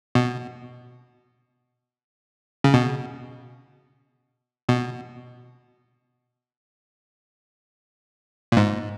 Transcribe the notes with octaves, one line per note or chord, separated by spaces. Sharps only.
B2
C#3
B2
B2
A#2
G#2